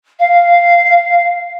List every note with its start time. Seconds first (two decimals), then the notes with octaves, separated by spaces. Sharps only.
0.19 F5